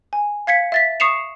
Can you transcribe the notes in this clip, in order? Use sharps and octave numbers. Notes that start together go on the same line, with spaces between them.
G#5
F5 G#6 B6 C#7
E5 A6 B6
C#6 D#6 C7 C#7 E7 F7